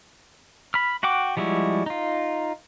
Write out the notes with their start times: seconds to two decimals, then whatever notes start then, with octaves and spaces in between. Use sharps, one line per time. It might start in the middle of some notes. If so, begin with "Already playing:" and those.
0.74 B5 F6
1.03 F#4 F#5 G5 D6
1.37 F3 G3 G#3 E4 F#4
1.86 D#4 F4